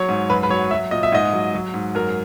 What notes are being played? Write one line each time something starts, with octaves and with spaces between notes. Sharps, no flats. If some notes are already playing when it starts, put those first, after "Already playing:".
Already playing: F#3 C#5
G#2
F#2 B4
B4
F#3 C#5
F#3 E5
A#2 D#5
E5
G#2 D#5
F#3
F#3
G#2
F#2 A#4